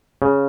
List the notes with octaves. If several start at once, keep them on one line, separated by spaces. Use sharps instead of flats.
C#3